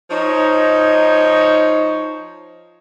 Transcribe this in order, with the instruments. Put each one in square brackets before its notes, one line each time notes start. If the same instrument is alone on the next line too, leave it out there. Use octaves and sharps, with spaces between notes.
[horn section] F3 D#4 C#5